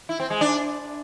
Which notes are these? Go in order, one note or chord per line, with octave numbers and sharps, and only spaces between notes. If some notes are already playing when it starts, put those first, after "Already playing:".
E4
C4
G#3
D4